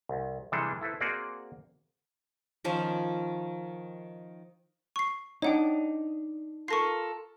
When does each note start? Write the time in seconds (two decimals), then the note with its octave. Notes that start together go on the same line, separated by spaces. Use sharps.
0.09 C2
0.52 C3 E3 G3 G#3 D4 A4
0.81 E4 A4 B4 C5
1.01 A#3 C4 F#4 G#4 D5
2.64 D#3 F3 C#4
4.96 C#6 C7
5.42 D4 D#4 C#5 F#5 G5
6.68 F4 A4 A#4 C#6 A#6 C7